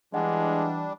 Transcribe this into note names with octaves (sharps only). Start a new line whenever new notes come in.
E3 G3 G#3 D4 D#5 F#5